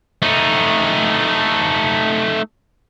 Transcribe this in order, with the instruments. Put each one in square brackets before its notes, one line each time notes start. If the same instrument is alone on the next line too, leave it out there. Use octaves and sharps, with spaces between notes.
[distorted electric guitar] A3 D#4